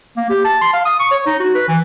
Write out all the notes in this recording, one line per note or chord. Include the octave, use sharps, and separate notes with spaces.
A#3
G4
A5
C6
F5
D#6
C#6
C#5
D#4
F#4
B4
E3